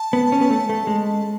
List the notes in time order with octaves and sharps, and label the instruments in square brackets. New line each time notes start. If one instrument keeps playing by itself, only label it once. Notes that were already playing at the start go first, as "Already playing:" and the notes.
Already playing: [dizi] A5
[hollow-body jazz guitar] B3
C#4
B3
A3
A3
G#3